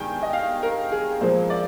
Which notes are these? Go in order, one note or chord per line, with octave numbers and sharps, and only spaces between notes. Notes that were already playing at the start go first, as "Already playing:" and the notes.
Already playing: G2 D#3 G#3 G5 G#5
D#5
F5
A#4
G#4
A#2 F3 G#3 C5
D5